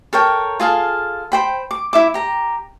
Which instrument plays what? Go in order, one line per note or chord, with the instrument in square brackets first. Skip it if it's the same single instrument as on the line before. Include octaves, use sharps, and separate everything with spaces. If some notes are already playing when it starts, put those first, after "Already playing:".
[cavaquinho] A4 A#4 C#5 G5
F4 G#4 A4 F5
C5 G5 B5
D6
E4 E5 D6
G4 A#5